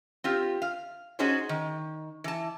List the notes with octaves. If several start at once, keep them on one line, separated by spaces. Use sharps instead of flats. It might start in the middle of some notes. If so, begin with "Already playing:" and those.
C4 F4 G4
F5
C#4 D#4 F#4 G#4 C5 C#5
D#3
E3 A5